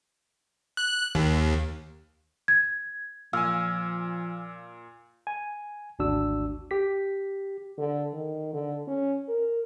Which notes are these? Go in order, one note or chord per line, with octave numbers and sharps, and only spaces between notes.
F#6
D#2
G#6
A#2 F3 F5 G#5 E6 F6
G#5
G#1 D2 D4 F#4 E6
G4 B6
D3
D#3
D3
C#4
A#4